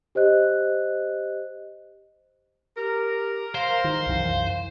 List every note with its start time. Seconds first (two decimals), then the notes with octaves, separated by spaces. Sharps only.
0.15 G4 C5 D#5 F#6
2.77 G4 A#4
3.55 C5 F5
3.84 D#3
4.06 C2 F#2 E3